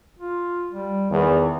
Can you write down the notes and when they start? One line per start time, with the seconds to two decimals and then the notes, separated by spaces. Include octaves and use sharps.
0.19 F4
0.71 G3
1.10 E2 D#3